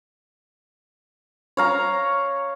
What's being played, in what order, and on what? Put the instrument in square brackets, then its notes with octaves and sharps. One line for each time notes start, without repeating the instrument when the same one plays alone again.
[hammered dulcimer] C#5 F5 A#5